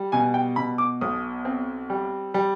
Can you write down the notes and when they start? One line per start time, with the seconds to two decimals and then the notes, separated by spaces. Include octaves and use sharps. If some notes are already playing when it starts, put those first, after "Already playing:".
Already playing: G3
0.12 B2 G#5
0.34 G5
0.56 B2 B5
0.78 D6
1.01 B1 D#6
1.45 C4
1.90 G3
2.34 G3